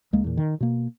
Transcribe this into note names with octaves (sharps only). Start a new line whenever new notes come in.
C#2 G#3 A#3
E2 A#2
D#3
B2 A#3